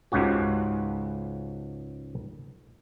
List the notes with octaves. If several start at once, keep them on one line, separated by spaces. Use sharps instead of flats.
C#2 G#2 C#3 F#4 G4